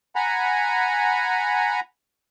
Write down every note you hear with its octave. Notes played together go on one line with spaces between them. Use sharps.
F#5 G#5 A#5 B5